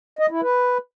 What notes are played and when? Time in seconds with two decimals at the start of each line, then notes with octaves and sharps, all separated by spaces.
0.19 D#5
0.31 E4
0.42 B4